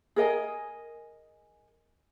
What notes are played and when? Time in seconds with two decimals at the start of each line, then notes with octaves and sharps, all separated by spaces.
0.16 G#4 A#4 D#5 G#5